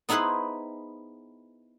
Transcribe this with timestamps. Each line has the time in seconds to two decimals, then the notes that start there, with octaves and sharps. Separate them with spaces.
0.09 B3 D#4 E4 G#4 B4 C5